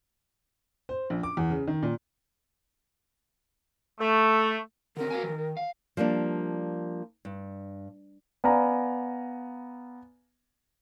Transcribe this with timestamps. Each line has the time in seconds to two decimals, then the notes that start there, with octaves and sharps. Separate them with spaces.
0.89 C5
1.10 A#1
1.23 D6
1.37 E2
1.50 C#3
1.68 D#3
1.83 A#2
4.00 A3
4.97 D3 C4 A#4
5.10 F#4 F5 G#5
5.23 D#3 F3
5.57 F5
5.97 F3 G3 A#3 D4
7.25 G2
8.44 B3 D5 F5 G#5 A#5